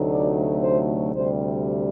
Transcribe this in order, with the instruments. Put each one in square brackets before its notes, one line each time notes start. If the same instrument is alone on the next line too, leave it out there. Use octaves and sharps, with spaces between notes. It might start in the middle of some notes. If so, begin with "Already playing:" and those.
Already playing: [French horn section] D2 C3 F#3 A3 D#4
D5
C5
D2 C3 G3 C5